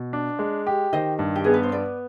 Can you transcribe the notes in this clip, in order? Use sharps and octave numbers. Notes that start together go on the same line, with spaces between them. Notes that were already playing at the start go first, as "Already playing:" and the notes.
Already playing: B2
D4
G#3
G4
D#3 C5 D#5
G2
G4
B3 G#4
B4
C5
B3 B4 D5